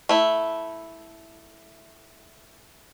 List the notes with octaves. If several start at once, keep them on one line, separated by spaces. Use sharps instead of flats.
A3 E4